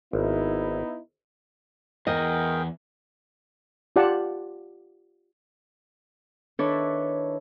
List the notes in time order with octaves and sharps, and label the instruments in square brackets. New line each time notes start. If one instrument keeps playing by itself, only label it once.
[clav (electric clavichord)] G#1 [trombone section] B3 D#4 E4
[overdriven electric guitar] E2 [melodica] G#4 G5 [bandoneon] A#4 [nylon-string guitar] D#5
[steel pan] F4 G4 D5 F#5 A5
[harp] D#3 D4 E4 A4 B4 C#5